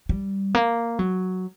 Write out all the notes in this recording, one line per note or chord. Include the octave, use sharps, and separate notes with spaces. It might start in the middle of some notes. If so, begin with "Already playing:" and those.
G3
A#3
F#3